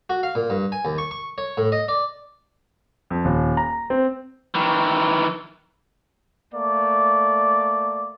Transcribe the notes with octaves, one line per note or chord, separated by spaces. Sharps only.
F#4
F5
A#2
G2
G#5
D#2
C#6
C#6
C#5
A2
D#5
D5
F2
D#1
A#5
C4
D#3 E3
A3 A#3 D5